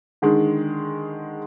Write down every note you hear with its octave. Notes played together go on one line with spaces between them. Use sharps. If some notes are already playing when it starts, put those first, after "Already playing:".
D3 D#3 G#3